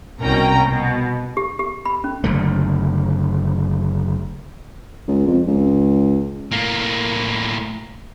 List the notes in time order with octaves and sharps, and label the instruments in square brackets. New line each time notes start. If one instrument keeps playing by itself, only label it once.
[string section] C2 B2 C#4 A#4 G5 A#5
B2
[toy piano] G4
G4
B5
C#4
[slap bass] F#1 D3 A3
[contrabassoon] C#2
F2
C#2
[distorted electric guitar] A2 A#3